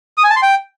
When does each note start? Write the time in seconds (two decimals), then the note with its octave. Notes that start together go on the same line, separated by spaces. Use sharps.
0.17 D#6
0.24 G#5
0.30 A5
0.36 C6
0.42 G5